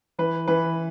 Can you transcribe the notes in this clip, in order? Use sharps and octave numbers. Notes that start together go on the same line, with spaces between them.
E3 B4
E3 B4